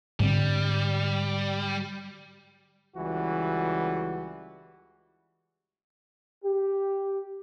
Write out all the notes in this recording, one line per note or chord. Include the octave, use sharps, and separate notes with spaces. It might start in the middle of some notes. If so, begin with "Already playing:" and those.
G#2 D3 G3 C4
C#2 E3 G3 F#4
G4